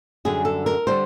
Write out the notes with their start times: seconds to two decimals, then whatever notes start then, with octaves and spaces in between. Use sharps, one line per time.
0.25 F#2 D3 G3 G#4
0.45 A4
0.66 A#4
0.87 D3 G3 C5